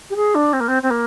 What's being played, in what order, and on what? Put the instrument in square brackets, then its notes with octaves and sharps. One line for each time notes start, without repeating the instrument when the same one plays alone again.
[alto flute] G4
G#4
D4
C4
A#3
C4
C4
A#3